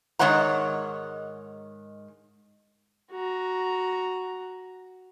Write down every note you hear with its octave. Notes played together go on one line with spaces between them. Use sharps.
G#2 D#3 G#3 C#5 F#5 A#5
F#4 A#5